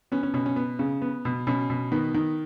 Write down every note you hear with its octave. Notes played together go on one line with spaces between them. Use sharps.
B3 C#4
C#4
B2 C#4
C#4
B3
C#3
B3
B2
B2 C#4
B2
D#3 B3
D#3